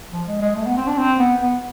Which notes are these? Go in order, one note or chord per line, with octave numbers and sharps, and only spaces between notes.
F3
G#3
G#3
A3
B3
C4
D4
C4
B3
B3